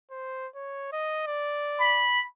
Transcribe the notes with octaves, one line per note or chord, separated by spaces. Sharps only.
C5
C#5
D#5
D5
B5